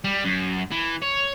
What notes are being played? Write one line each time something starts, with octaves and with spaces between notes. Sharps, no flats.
G3
F#2
E3
C#5